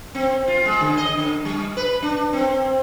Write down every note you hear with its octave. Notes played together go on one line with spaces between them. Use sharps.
C4
F4
G#3
D3
D#5
D3
G3
B4
D4
C4